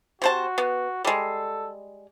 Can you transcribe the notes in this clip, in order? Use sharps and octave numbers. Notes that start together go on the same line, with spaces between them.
C3 F#4 C5 A5
B3
G3 G#3 A4